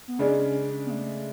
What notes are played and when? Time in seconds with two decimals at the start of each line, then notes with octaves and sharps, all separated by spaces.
0.08 B3
0.19 C#3 G#3 C#4 D4
0.86 B3
0.91 A3